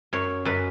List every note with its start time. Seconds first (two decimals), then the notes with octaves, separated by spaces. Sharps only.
0.13 F#2 C#5
0.45 F#2 B4